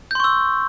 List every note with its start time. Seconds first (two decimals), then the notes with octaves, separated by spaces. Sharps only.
0.11 G6
0.15 C6
0.20 C#6
0.24 E6